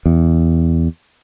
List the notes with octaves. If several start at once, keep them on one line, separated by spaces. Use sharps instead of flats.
E2